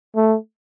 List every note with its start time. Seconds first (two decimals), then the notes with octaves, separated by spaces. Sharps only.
0.16 A3